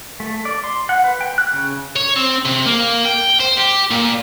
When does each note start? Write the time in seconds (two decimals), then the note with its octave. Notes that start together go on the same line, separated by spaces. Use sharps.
0.20 A3
0.45 D5
0.64 C6
0.89 F#5
1.04 B4
1.21 G5
1.38 F#6
1.53 C#3
1.96 C#5
2.16 C4
2.46 C3
2.66 A#3
3.05 G5
3.40 C5
3.58 G4
3.91 A#2